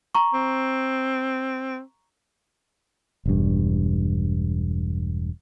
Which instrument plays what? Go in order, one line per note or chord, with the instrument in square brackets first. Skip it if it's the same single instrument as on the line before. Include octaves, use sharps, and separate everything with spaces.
[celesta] A#5 C#6
[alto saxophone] C4
[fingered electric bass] E1 G2